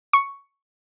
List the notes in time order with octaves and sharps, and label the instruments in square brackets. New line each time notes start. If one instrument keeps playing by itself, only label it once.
[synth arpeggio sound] C#6